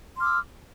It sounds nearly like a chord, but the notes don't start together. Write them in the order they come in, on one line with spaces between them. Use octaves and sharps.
C6 F6 D6 E6